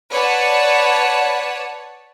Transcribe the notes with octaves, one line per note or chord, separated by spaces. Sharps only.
B4 C#5 D5 F#5 A5